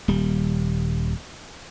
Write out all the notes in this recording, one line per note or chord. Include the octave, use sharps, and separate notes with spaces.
D#1 G3